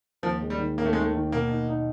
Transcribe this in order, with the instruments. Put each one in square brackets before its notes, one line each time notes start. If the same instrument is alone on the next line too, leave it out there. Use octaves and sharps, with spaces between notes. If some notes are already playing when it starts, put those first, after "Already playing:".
[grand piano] D#2 [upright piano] F3
[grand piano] G#3
[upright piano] G3
[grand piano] D#3
[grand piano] D#2 [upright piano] A#3
[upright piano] A3
G#3
[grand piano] D#3 [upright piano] A3
[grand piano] D#3
[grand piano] B2 [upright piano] A#3
[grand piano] D#4
D#4